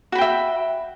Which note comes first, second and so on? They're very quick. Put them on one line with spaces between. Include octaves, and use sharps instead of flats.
F#4 B5 G5 E5